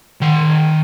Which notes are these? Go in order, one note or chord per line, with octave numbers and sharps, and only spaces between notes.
D#3 C6